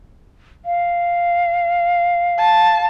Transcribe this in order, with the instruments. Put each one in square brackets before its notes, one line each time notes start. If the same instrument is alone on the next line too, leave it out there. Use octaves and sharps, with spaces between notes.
[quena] F5
[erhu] A5